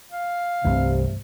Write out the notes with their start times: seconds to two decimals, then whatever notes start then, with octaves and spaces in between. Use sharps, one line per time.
0.11 F5
0.65 C2 G2 C3 E3 A3